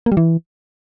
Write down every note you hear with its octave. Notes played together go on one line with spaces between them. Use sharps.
A#3
G3
E3